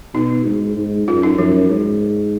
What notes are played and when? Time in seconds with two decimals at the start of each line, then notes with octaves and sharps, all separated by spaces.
0.14 B2 D#4
0.45 G#2
0.76 G#2
1.08 F#2 F4
1.23 D#4
1.38 F#2 F3
1.70 G#2